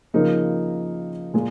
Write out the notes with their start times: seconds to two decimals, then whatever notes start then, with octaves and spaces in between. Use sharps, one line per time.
0.14 C#3 F3 A#3 D#4 A#4
1.34 A#2 G#3 G#4